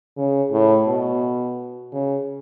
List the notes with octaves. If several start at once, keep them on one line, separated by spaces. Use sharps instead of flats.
C#3
A2
B2
C#3